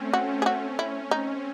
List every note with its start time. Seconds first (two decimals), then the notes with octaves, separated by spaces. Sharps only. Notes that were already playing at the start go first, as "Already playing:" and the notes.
Already playing: A3 C4 C#4
0.13 C4 F#4
0.42 G#4
0.46 C#4 F#4
0.79 E4
1.10 C4 D#4